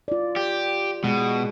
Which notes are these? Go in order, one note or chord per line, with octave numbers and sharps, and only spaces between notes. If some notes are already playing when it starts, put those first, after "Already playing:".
F4 D5
G4
B2 G#3